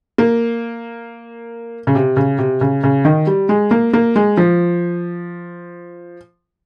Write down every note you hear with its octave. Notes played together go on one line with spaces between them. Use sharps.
A#3
C#3
C3
C#3
C3
C#3
C#3
D#3
G3
G#3
A#3
A#3
G#3
F3